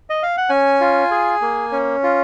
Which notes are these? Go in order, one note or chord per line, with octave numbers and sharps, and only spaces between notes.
D#5
F5
F#5
C#4 G#5
F4
G#4
A#3
C#4
F4